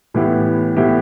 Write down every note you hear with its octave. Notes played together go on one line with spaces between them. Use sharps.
A2 E3 B3 E4 G4
A2 E3 B3 E4 G4